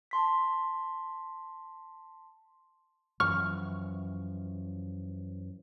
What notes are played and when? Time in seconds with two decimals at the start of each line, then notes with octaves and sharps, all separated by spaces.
0.11 A5 C6 B6
3.20 F#2 E3 F3 C#6 F6